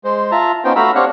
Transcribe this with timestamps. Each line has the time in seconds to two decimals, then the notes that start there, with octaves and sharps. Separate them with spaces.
0.04 G#3 C5
0.31 F4 E5 A5 A#5
0.64 B3 C#4 D#4 F4 C5 G5
0.76 A3 F#4 F5 A#5 B5 E6
0.95 C4 D4 G4 C#5 F5 F#5